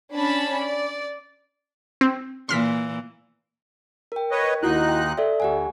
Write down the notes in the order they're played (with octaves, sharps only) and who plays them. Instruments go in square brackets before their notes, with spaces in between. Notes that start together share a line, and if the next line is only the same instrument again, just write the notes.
[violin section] C#4 D4 A5 B5
D5
[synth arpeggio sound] C4
[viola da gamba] A#2 E3 [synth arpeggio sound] C6 F6 B6
[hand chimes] A#4 G5
[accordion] B4 C#5 D#5
[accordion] D#2 D#4 F#6 [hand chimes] E4 F#4 F#5
[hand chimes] G5 C6
A4 D5 E5
[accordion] D2 [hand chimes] G4 F#5 G#5